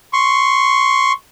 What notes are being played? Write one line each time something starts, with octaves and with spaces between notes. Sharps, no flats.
C6 C#6